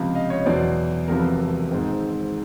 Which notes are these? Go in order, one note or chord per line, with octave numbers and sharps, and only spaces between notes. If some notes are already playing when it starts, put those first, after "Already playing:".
Already playing: C#2 C3 F3
D#5 F5
C#5 D#5
E2 B2 F#3 C5 D5
E1 E2 C3 F3 A#4
A4 B4
A#4
A4
G#2 D#3 G#3 C4 D#4